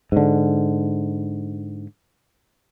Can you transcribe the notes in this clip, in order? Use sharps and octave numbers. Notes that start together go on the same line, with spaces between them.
G#2 D3